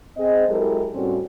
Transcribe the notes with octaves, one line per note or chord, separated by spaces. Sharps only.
C4 G#4 C5 D#5
F#3 G#3 E4 G4 A4 A#4
A2 G3 A3 C4 C#4 F#4